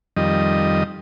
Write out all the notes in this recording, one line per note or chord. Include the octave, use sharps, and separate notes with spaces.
F2 D#3 G3 D#5